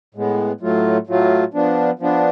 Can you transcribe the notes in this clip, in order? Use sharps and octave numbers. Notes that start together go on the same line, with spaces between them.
A2 G#3 B3
A2 F#3 A3 F4
A2 F#3 A3 F4
F3 B3 D4
F3 B3 D4